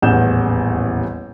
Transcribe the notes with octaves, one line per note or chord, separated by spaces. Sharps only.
D#1 A1 E2 F#5 G6 E7